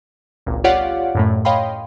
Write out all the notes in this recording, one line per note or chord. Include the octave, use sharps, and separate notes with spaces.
G#1 C#2 A#2
F4 G4 C#5 D5 F5 F#5
F#2 A2 A3
C#5 D#5 F5 G5 B5 C6